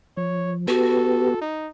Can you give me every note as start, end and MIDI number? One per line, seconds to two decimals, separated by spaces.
0.17 0.67 53
0.17 0.53 73
0.68 1.34 59
0.68 1.37 66
0.68 1.34 67
0.68 1.37 69
0.68 1.34 71
1.42 1.69 63